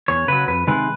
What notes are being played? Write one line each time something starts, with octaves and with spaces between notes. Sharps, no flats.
E2 C#5
C#3 F#3 B4
F2 B4
C3 D#3 G#3 B4